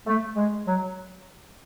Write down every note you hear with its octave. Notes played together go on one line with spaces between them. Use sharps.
A3
G#3
F#3